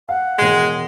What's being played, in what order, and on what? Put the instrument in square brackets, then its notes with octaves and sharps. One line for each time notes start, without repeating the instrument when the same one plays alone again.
[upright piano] F5 [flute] F#5
[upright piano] E1 A#6 [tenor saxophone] G#3 [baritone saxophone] G#4